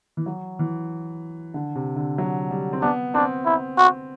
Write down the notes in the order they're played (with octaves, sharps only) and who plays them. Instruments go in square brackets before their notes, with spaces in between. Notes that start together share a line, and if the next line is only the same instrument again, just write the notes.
[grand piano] E3
F#3
E3
D3
C3
D3
F#3
G3
C4
[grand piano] B3 [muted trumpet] D4
[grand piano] C4 [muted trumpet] D4
[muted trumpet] E4
F#4